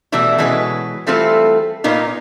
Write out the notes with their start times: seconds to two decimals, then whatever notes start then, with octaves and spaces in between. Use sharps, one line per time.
0.12 B2 E3 G3 A3 E4
0.38 B2 E3 G#3 C#4 F#4 B4
1.07 E3 G3 A3 C4 F4 A4
1.84 A#2 A#3 B3 D#4 F4